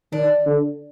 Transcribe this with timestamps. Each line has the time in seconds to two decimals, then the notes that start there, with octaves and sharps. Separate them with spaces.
0.13 D#3 D4
0.47 D3